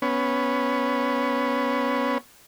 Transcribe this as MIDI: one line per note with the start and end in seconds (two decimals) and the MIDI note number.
0.02 2.18 59
0.02 2.18 61